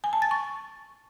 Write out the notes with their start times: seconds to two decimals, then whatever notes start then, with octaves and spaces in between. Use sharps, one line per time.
0.04 G#5
0.13 A5
0.22 A6
0.31 C#6